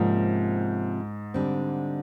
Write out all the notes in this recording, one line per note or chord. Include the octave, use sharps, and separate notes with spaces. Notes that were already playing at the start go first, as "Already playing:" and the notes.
Already playing: G#2 C3 F3 A#3 C#4
D3 G3 C4